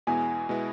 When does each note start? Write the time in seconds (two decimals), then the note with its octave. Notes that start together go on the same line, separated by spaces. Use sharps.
0.07 E2 B2 G#3 B3 E4 G#5
0.49 B2 G#3 B3 E4